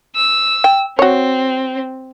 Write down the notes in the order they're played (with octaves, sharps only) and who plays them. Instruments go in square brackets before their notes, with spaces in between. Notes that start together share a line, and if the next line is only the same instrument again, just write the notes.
[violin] E6
[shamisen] G5
[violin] C4 [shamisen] F#4 C#5